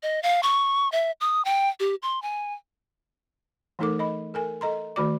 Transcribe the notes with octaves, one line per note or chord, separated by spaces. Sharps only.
D#5
F5
C#6
E5
D#6
G5
G4
C6
G#5
E3 A3 D#4 A4 A#4 D6
D#5 B5
A4 A#4 G#5
A4 D#5 A#5 C6
D#3 A3 F#4 D5 D6